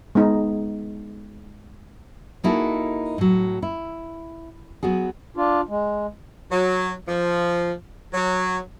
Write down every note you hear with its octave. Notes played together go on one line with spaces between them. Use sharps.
G#3 B3 D#4
A#3 D#4 E4 F#4 G#4 A4
A2 F#3
E4
F#3 B3 F#4 G#4
D4 F4
G#3
F#3
F3
F#3